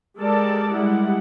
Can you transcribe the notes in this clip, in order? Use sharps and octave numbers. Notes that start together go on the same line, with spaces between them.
G#3 G4 A4 A#4 D5 A5
G3 G#3 E4 F#5